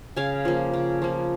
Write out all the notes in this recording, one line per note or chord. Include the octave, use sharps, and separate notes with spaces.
C#3 F5 G#5
F3 A#3
C#3
F3 A#3